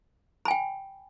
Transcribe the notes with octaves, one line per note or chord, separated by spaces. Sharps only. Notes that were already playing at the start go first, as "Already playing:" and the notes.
G5 G#5 B5